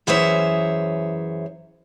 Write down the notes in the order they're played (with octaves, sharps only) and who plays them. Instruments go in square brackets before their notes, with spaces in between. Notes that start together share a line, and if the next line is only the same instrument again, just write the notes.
[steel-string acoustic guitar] F#2 E3 G#4 C5 C#5 E5